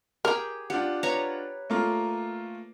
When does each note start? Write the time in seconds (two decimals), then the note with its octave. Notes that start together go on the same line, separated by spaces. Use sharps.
0.25 G4 G#4 A#4 G5
0.70 D4 F4 G4 F#5
1.03 B4 C#5 A#5
1.70 A3 A#3 F4